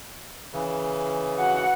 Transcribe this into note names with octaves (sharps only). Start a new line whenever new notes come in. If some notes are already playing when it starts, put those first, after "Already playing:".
C#3 E3
F#4 F#5